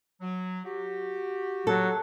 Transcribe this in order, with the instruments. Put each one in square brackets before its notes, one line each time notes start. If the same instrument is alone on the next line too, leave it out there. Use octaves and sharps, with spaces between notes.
[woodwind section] F#3
F#4 G4
[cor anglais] F#3 [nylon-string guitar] A4